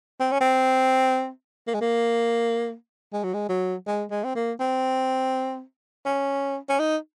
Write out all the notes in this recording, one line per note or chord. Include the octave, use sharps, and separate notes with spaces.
C4
C#4
C4
A#3
G#3
A#3
G#3
F#3
G#3
F#3
G#3
G#3
C4
A#3
C4
C#4
C#4
D#4